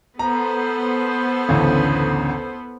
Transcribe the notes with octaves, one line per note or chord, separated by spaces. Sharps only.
B3 A4 C5 A#5
A1 D2 C#3